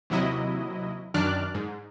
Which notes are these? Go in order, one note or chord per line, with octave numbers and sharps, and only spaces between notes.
D#2 C3 F#3 E4 D#5
F#2 D#3 D4 D5 F6 F#6
G#2